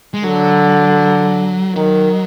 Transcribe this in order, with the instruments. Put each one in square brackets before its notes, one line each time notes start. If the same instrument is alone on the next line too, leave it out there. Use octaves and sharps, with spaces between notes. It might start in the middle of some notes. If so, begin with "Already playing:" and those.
[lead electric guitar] G#3
[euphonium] D3 [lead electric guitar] F#3
[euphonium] D#3 [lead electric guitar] F#3